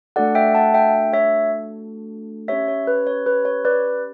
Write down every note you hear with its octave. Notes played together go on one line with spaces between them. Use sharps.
A3 D4 F#4 A4 D5 F#5
E5 G5
F#5 A5
E5 G5
C#5 E5
C#4 G4 C#5 E5
C#5
B4
C#5
B4
C#5
B4 D5